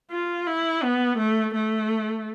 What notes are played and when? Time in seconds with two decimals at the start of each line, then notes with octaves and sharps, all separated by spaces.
0.11 F4
0.47 E4
0.83 B3
1.18 A3
1.54 A3